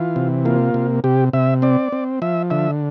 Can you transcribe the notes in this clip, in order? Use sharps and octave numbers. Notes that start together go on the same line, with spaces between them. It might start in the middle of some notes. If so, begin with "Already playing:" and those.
Already playing: E3 F4
C3
A#3 F4
C3
C3 G4
C3 E5
C4 D5
C4
F3 E5
D3 E5